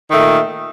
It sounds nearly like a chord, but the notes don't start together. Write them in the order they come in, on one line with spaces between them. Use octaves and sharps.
D#3 A3 A#2